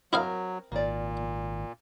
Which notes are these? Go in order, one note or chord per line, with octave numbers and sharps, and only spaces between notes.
F#3 C4 E4 A#4 D#5 F5
G#1 A#2 A#3 D5